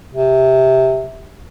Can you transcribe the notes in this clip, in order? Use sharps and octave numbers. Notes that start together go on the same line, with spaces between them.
C3